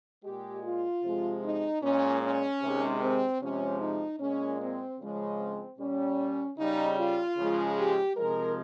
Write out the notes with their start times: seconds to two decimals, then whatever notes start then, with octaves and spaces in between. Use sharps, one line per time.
0.23 A#2 G#3 G4
0.63 F4
1.03 C3 F3 G#3
1.42 D#4
1.82 A#2 G#3 C#4
2.22 C#4
2.61 C3 D#3 G#3
3.00 C4
3.41 C3 F3 G#3 C#4
3.80 D#4
4.20 A#2 G#3 C#4
4.59 C4
4.99 C#3 F3 G#3
5.38 C4
5.78 A#2 G3 C#4
6.58 C#3 G3 D#4
6.97 F4
7.37 C#3 F3 G#3
7.77 G4
8.16 C3 F3 G#3 A#4